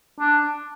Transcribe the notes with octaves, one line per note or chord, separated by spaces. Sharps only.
D4